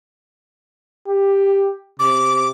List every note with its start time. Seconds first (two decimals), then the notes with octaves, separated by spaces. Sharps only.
1.07 G4
1.99 C3 D6